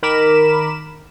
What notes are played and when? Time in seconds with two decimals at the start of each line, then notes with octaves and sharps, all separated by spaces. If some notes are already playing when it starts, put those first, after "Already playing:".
0.03 D#3 A#4 B5 D6 E7